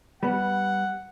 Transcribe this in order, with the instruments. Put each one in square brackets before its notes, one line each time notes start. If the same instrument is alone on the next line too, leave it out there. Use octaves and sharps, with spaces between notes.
[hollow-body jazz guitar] G3 B3 [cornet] F#5